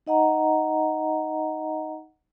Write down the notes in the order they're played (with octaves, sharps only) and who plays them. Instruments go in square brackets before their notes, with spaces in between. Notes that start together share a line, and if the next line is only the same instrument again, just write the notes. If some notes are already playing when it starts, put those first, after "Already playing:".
[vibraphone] D#4 D#5 F#5 A#5